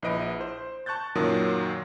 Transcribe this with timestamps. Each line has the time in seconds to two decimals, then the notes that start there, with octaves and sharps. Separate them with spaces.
0.02 A#1 E4 B4 D#5 D7
0.41 C5
0.86 A5 C#6 F#6 G6 A6
1.15 F#2 A#2 D#3 F#3 D#6